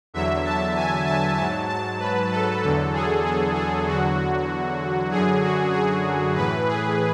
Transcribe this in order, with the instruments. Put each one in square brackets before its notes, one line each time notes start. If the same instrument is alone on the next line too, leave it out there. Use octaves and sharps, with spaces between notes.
[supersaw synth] E2 D3 F#3 E5
A5
G#5
A5
G#2 F#3 A5
A5
B4
A4
E2 D3 F#3 A4
G#4
G#4
G#4
E2 D3 F#3 F#4
F#2 D3 F#3 G#4
F#4
G#4
A2 E3 B4
G#4